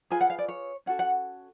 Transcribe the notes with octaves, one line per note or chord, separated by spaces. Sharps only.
F4 G#4 B4 G#5
F#5
F5
D5
C#5
C#4 F#4 A4 F#5
F#5